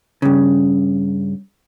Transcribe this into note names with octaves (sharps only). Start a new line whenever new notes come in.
G2 C#3